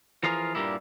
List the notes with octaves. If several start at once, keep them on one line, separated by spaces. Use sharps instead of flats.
E3 F3 F4 G#4 A#4
G2 A#2 G3 A#3 E4